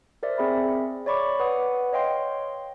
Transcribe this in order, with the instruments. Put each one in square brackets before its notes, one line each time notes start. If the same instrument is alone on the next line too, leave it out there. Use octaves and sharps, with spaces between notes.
[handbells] A#4 C5 D5 E5
C4 G#4 E5 B5
C#5 D5 B5 C#6 D6
B4 F#5 D#6
C#5 D#5 F5 G5 C6